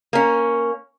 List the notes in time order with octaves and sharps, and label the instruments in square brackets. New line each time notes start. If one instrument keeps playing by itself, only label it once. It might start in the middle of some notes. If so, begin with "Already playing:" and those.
[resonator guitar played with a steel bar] A#3 C#4